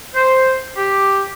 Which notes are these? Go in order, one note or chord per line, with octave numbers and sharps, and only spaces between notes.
C5
G4